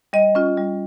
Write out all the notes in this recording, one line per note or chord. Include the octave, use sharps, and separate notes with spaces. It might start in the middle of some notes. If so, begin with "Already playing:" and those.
G3 D#5
C#4 F4
G3